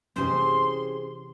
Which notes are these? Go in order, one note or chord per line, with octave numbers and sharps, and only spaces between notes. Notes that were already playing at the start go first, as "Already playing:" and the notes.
C3 E3 C#4 G4 G#4 C5 C6